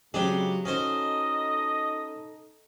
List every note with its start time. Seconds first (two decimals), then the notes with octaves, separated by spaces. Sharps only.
0.14 C#3 F#3 G#3 C4 D4 G4 G#4
0.65 C#4 D#4 F#4 A4 C5 D#5